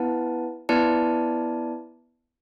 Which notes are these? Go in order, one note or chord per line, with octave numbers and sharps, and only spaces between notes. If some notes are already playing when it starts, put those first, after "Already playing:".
Already playing: B3 E4 B4 F#5 A5
B3 E4 B4 D5 A5